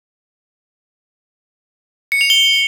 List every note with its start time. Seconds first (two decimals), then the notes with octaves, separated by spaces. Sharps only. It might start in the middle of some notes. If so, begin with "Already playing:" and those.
2.12 C#7
2.21 F7
2.30 G7